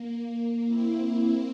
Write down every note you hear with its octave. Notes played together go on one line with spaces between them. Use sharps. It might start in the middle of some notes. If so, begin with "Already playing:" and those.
Already playing: A#3
C4 E4